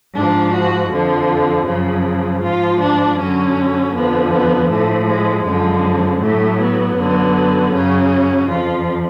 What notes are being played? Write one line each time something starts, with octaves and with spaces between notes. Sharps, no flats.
G#2 F3 D4
F#4
F2 D3 F3
F#2 C#3 F3
G#2 F3 F4
D4
F#2 D3 F#3 C#4
F2 D3 F3 B3
B3
A2 F3 A3
G#3
F#2 D3 F3 G#3
A2 F#3 A3
B3
F#2 D3 F#3
F#2 C#3 F#3 C#4
F2 F3 F4